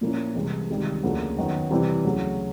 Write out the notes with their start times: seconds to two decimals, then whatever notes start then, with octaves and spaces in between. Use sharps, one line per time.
0.01 A#2 F3 A#3 C#4 E4
0.35 C2 C3 E3 G#3
0.69 C#2 C3 D#3 G3
1.03 D2 C#3 F3 A#3 D4
1.37 F#2 D#3 F#3 B3
1.71 C3 E3 G3 C4 E4
2.05 D2 C#3 F#3